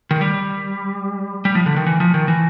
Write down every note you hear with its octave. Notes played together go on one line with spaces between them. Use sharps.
D#3
G3
G3
F3
D3
D#3
E3
F3
D#3
E3